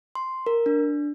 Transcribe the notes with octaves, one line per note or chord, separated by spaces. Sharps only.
C6
A#4
D4